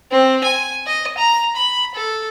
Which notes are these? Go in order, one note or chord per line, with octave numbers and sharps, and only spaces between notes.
C4
G#5
D#5
A#5
B5
A4